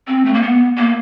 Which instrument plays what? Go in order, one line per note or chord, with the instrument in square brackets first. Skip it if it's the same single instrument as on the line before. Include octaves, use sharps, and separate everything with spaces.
[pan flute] C4
A3
A#3
B3
A#3